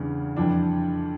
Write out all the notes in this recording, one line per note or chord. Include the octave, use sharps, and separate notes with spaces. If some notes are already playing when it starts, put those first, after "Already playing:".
Already playing: E2 C#3 E3 G3 D4
F2 E3 G3 D4